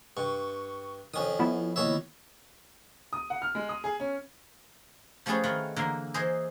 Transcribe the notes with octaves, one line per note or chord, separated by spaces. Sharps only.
G2 C#6
F2 D#3 C#4 D#6
F3 B3 E4
D#2 C#5 E5
D#6
F#5
F6
G#3
D#6
G#4
C#4
F3 A3 C#4 G4 G#4 B4
D#3 F4 F#5
D3 E3 A#3 A#4
E3 G#4 C5 D#5